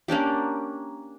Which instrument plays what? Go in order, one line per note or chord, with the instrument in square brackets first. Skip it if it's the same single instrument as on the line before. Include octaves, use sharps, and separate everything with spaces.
[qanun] A#3 C#4 D4 G4